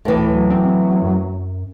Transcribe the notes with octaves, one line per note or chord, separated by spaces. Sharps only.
D2 A2 E3
F#3
C4
F#2